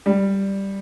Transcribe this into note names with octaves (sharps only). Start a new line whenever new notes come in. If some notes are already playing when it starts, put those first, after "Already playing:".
G3